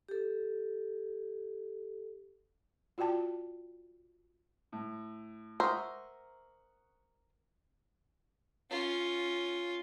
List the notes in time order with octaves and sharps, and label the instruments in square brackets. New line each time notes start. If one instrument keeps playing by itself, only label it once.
[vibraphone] G4 A4
[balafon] F4 F#4 D5 G5 A5
[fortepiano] A2
[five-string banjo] A#4 C5 E5 [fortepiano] F#5 C#6 D#6
[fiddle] C#4 F4